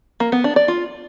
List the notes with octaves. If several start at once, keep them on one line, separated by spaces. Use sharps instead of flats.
A#3
B3
D4
D5
F4